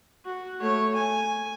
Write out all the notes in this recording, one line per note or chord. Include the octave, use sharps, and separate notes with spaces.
F#4
A3 C#5
G#5